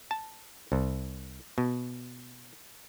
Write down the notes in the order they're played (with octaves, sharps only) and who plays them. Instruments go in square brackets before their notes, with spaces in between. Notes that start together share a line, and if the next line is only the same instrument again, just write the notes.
[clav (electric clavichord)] A5
C2
B2